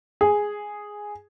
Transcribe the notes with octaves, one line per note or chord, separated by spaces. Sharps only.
G#4